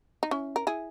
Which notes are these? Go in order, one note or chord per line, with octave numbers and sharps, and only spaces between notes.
D#4
C#4 E4
A#4
E4 G#4